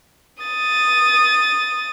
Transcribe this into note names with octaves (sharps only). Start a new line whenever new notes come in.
D#6 A6